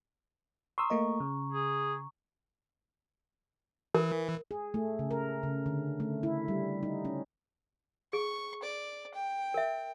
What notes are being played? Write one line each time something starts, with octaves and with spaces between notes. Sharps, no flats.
A#5 C6 C#6 D#6 E6
A3 A#3 D#5
C#3
G#4
E3 A#4
G#4
A3
C#3
A#4
C#3
D3
A3
E4
G3
D#4
C#4
G#4 C#6
D5
G5
A#4 E5